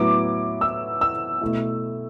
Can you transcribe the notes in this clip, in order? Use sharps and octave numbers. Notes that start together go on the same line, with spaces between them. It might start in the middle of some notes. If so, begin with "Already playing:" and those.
Already playing: A2 F#3 B3 E4 D6
E6
E6
B2 A3 E4